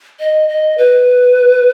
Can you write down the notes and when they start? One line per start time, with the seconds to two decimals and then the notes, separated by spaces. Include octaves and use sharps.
0.20 D#5
0.49 D#5
0.78 B4